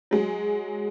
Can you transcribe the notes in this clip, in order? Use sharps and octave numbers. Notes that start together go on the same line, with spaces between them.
F#3 G#3